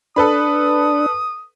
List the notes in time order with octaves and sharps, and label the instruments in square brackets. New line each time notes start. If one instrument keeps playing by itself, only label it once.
[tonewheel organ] D4 [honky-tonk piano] A4 B4 B5 [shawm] D#6